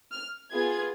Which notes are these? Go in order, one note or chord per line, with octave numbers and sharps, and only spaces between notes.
F6
B3 F4 G#4 G#6